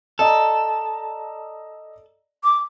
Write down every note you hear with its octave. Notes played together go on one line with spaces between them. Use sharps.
A4 D5 D#5 A#5
D6